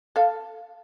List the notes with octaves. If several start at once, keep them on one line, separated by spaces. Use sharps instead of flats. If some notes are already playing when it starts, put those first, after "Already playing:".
A4 F5